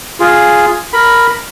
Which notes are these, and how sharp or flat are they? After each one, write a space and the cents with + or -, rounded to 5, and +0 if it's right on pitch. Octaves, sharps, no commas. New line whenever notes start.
F4 +0 G#4 +0
A#4 +0 B5 +0